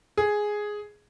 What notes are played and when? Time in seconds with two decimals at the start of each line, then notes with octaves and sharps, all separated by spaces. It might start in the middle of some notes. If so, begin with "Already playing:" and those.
0.17 G#4